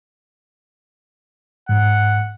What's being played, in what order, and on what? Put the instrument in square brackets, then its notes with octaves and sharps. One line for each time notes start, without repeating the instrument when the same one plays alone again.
[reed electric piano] G#2 [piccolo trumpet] F#5